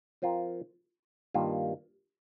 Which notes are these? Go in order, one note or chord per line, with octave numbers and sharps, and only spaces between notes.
F3 C4 F4 A#4
G2 D#3 G3 A#3 F4